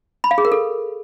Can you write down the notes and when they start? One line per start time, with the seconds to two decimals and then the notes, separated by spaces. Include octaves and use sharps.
0.24 B5
0.31 F5
0.38 G#4
0.45 A#4
0.52 A4